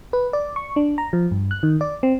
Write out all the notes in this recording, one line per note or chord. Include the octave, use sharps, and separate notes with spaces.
B4
D5
C#6
D4
A#5
F3
G2
F#6
D#3
D5
C4